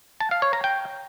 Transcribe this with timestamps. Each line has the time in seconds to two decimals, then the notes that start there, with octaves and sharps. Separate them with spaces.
0.21 A5
0.31 F5
0.42 C#5
0.53 A#5
0.64 G5